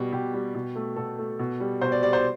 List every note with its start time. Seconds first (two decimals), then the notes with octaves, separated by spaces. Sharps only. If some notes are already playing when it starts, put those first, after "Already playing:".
Already playing: B2 G3
0.12 B2 G4
0.33 G3
0.54 B2
0.76 A3
0.96 B2 A4
1.19 A3
1.39 B2
1.60 G3
1.81 B2 C5
1.92 D5
2.02 G3 D5
2.13 C5